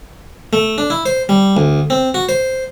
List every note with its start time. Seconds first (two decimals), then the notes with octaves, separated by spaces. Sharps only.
0.53 A3
0.78 D4
0.90 E4
1.06 C5
1.29 G3
1.57 D2
1.90 C4
2.14 F#4
2.29 C5